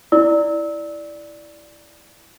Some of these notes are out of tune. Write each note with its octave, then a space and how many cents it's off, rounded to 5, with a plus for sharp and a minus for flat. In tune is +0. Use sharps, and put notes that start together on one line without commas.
E4 -5 D5 +0 E6 -25